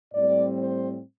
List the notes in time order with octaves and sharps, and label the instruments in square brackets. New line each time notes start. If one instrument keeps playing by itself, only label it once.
[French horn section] A2 G3 C4 D5
C5